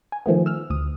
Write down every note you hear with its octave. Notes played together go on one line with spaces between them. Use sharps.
G#5
D#3 F3 A3 B3
E6 F6
D2 D#6